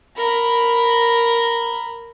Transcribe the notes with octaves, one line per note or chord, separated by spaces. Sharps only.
A#4 B5